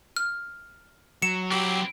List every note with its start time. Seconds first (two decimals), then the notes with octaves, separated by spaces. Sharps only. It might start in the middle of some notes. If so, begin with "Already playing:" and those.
0.17 F6
1.22 F#3 C#7 E7
1.51 C4 E4 G4